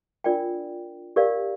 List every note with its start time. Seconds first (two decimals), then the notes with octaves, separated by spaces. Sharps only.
0.24 D4 F4 A#4 D5 G5
1.16 G4 A#4 D5 F5